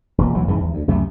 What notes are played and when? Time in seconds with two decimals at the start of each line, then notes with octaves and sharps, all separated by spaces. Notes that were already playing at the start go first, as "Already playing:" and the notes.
0.18 E1 A#2
0.35 D2 E3 F#3
0.47 F2 G#2 C#3 E3
0.61 E2
0.74 D2
0.87 C#2 F#2 C3 A3